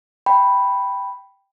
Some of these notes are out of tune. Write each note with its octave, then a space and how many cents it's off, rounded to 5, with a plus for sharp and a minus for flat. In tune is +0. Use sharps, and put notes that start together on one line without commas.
G5 +0 B5 +0